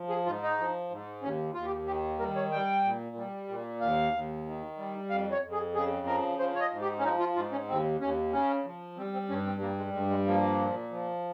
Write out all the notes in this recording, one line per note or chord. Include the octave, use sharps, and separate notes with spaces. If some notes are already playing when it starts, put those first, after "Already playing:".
Already playing: F3
G#4
G#2 F4
D#4
F3
G#2
D#2 C#4
D#2 F4
G4
D#3 G4
G3 A#4
C#5
G3 G5
A#2
G3
A#2
D#2 F5
D#2
D#3
G3
F2 F5
C#5
F2
G#4
C#3 G#4
F3 A#4
F3 C5
C#5
D#5
G#2
G4
C#4
F3 D#4
F4
G#2 F4
C#4
D#2 C4
D#2 C#4
C#3 C#4
F3
G3 C4
C4
G2 C#4
C4
G3 A#3
G#3
G2 G#3
G#3
F3 A#3
A#2
F3